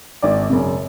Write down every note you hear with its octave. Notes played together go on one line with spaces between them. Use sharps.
G#1 D5
F#2 C#3